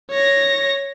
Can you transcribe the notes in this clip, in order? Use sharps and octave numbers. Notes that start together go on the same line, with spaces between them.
C#5 A#6